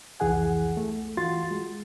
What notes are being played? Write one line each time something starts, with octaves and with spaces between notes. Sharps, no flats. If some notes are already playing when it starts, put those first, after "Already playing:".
C2 F2 E3 G#4 F#5 G#5
A3
E3 F4 F#4 C6 A6
G#3